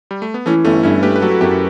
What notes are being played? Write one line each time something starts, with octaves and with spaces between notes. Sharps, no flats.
G3
A3
B3
E3 A3 C#4
G1 A3 C#4
G2 C#4 E4
A3 G4 B4
B4
F#3 F#4 A4
F#4
F#2 E4 G4